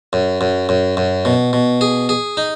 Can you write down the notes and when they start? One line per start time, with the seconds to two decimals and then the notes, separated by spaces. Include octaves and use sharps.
0.13 F#2
0.41 F#2
0.69 F#2
0.97 F#2
1.25 B2
1.53 B2
1.81 G#4
2.09 G#4
2.37 D#4